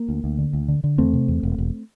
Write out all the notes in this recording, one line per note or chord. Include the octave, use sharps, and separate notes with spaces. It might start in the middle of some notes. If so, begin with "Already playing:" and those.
Already playing: A#3
D2
D2
D3
D2
D3
D3
E2 A3 C4
C3
E2
E1
E1